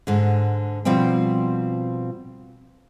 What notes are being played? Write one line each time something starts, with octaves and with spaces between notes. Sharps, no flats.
G#2 D3
B2 F3 G3 C4 G5